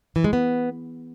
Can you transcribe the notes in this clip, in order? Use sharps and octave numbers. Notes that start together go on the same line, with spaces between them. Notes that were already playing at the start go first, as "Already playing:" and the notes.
E3
G#3
B3